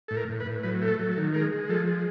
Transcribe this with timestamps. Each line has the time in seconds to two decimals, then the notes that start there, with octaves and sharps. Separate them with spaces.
0.08 A2 A4
0.17 A#4
0.29 A2
0.40 B4
0.46 A2
0.63 F#3 B4
0.82 A3
0.88 A4
0.99 F#3
1.11 A4
1.17 D#3
1.34 G#3 A#4
1.52 G#3
1.69 F3 A4
1.87 G#3